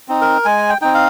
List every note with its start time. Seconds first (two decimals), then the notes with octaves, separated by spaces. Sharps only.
0.08 C4 D#4
0.21 A#4
0.45 G#3 G#5
0.70 G5
0.82 C4 D#4 G5
0.94 F5